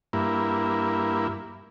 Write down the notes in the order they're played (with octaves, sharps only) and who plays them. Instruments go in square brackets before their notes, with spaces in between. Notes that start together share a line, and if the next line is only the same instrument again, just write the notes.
[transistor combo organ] G2 A#3 E4